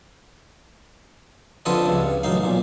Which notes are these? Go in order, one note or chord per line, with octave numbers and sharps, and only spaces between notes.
F2 D3 F4 A4 B4 D#5
C#2 G2
A1 F#2 D#4 F5
B1 A#2